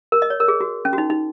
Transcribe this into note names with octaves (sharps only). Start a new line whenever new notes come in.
A#4
D#5
C#5
A#4
G#4
F#4
C#4
F#4
D#4
D#4